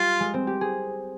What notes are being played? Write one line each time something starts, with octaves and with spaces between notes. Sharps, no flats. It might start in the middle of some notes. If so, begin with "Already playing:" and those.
Already playing: G3 F4
G#3
C4
G4
G#4